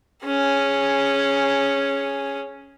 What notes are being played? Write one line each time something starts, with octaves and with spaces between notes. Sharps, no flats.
C#4 G#4